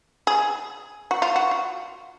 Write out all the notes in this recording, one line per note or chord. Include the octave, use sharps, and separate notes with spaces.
G#4
F#4
F4
F#4
F4